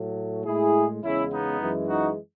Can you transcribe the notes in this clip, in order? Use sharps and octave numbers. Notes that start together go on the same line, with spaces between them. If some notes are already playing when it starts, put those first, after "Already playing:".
Already playing: A2 F#3 A3
A2 G#3 E4 G#4
E2 C#3 G#3 C#4 E4
B3 D#4
F#2 E3 G#3
D#4 F#4